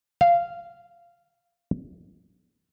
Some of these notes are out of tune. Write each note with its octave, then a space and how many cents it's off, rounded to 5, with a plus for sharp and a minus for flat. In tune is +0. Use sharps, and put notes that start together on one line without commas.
F5 -15